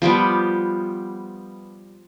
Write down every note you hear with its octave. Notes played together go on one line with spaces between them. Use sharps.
F3 G3 B3 G4